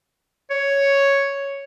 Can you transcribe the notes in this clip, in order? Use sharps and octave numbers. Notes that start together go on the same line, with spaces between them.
C#5